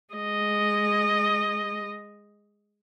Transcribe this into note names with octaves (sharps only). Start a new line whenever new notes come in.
G#3 D#5